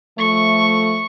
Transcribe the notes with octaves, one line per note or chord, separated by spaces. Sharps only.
F3 A3 C#6